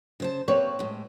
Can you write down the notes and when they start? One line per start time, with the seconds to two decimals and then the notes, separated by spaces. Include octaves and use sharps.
0.20 C#3 C5 A5
0.48 A#3 C4 B4 C#5
0.79 A2 G#3